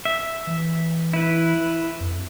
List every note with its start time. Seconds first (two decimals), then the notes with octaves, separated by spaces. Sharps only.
0.05 E5
0.47 E3
1.13 E4 B4
2.01 F2